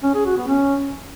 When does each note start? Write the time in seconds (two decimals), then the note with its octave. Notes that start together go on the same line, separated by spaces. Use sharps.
0.03 C#4
0.14 G#4
0.25 F#4
0.37 B3
0.48 C#4